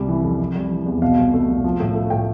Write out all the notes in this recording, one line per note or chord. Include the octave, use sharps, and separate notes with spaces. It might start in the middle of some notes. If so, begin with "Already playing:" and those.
Already playing: C2 C3 G3
E3
F2
C3
G3
E3
E2
B2 F5
C2
A3
C2
F3
A2
A3
A2 G5